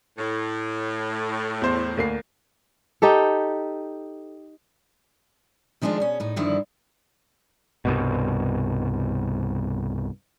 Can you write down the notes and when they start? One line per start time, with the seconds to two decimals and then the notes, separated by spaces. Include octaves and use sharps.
0.18 A2
1.62 E2 C5
1.97 D2 A#3 C7
3.02 D#4 G4 A4
5.82 D#3 F3 G#3 A3 D4 F4
6.00 B2 C#4
6.20 A2 D#4
6.36 G2 D3 D#3 F3 E4
7.85 C2 G2 B2